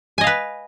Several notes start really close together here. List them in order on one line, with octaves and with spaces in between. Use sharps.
G#5 D#5 F5 B4